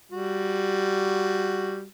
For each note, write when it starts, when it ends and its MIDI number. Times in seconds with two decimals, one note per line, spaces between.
0.11 1.85 55
0.11 1.85 66